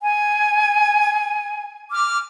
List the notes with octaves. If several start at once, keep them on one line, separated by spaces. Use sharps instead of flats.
G#5
D6 F6